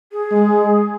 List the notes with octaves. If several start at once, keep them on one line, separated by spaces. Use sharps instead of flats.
G#4
G#3